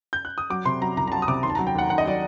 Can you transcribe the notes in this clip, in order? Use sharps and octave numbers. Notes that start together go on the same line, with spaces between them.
G6
F#6
D#6
F#3 D6
C3 C6
F#3 A#5
C2 A#5
A#5
F#3 A5
D#6
C3 D6
D#2 C6
A5
A#5
F#3
G5
D#2 F#5
D#2 F#5
D#5
F#3 D5